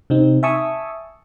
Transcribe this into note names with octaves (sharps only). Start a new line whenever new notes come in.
C3 C4 D#4
E5 G#5 A5 C#6 D#6 E6